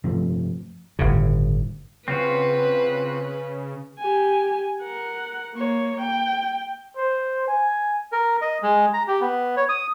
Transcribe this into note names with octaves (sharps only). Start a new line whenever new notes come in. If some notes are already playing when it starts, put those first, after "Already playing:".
G2 C3 F3 A3
G1 A2 C#3
C#3 C4 F4 F#4 B4
G4 G#5
A#4 F#5
A#3 C#5
G5
C5
G#5
A#4
D#5
G#3
A#5
G4
B3
C#5
D#6